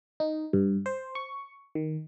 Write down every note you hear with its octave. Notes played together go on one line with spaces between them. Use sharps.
D#4
G2
C5
C#6
D#3